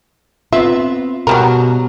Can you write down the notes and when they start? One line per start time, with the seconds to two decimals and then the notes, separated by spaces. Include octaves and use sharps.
0.53 B3 C4 F4 E5
1.27 B2 F#3 G3 A#4